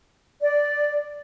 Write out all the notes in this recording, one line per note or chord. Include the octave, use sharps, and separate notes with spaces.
D5